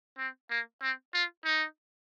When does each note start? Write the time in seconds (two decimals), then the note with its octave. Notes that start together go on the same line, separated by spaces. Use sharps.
0.18 C4
0.50 A#3
0.82 C4
1.14 F4
1.45 D#4